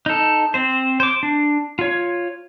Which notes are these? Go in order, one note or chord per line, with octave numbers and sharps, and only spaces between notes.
D#4 A4
C4 C5
C5 D6
D4
F4 C#5